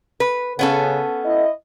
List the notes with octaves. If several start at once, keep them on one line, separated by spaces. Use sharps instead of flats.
B4
C#3 B3 C#4 A4
E4 D#5